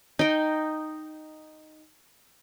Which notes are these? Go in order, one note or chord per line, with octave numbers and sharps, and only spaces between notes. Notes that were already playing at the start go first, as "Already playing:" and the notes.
D#4 G5